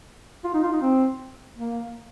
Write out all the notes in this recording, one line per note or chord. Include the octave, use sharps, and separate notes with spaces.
F4
D#4
F4
D#4
C4
A#3